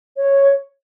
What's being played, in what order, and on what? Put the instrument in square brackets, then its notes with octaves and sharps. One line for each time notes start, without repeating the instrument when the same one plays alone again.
[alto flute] C#5